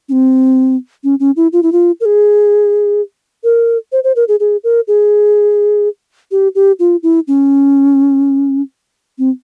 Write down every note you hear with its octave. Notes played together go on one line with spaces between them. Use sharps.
C#4
C4
C#4
C#4
E4
F4
E4
F4
A#4
G#4
A#4
C5
C5
A#4
G#4
G#4
A#4
G#4
G4
G4
F4
E4
C#4
C4